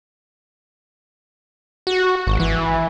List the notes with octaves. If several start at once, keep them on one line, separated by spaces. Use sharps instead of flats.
F#4
G#1
E3